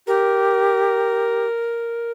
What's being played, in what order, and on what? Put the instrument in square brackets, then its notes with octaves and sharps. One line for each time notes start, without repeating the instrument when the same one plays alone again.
[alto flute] G4 [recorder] A#4